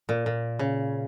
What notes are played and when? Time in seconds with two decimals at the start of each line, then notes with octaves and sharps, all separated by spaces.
0.09 A#2
0.26 A#2
0.59 C#3